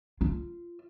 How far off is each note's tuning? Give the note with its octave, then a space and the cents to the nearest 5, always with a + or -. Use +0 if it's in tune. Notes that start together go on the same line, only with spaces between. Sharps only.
F4 -15